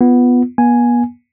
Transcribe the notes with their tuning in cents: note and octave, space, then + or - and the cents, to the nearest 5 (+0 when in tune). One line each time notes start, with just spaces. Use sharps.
B3 +0 F4 +0
B3 -40 G#5 +0